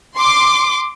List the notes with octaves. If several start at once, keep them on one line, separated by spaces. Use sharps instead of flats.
C6 D6